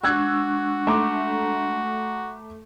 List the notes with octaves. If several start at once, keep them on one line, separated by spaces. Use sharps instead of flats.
G#3 D4 F#4 C#6 E6 F#6 G#6
A3 A#5 C6 D6